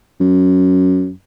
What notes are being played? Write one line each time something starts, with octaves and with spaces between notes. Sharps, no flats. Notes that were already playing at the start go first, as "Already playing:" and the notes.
F#2